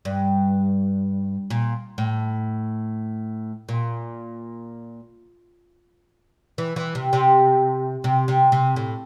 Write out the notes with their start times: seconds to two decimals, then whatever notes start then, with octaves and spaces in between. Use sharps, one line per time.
0.05 G2
1.50 A#2
1.98 A2
3.69 A#2
6.58 E3
6.76 E3
6.95 C3
7.13 C3
8.04 C3
8.28 C3
8.52 C3
8.76 A2